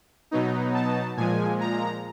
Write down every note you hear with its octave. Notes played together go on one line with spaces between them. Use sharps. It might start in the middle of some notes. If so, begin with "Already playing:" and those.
B2 F#3 B3 D#4
A5
A#2 F3 G#3 G#5
A#5